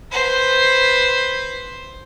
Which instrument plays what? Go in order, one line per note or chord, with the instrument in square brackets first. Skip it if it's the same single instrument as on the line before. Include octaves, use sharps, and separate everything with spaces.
[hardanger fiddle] B4 C5